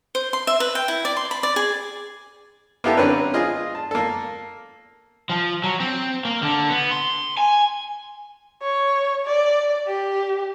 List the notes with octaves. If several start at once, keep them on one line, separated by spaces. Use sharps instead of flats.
C5
C6
E5
B4
G5
E4
D5
C6
B5
D5
G#4
A#3 B3 E4 G4 A4
D3 C4 C#4 A#4 B4
F4 G#4 D#5 G#5
A5
A#3 A4
F3
F#3
C4
A#3
D3
B3
C6
G#5
C#5
D5
G4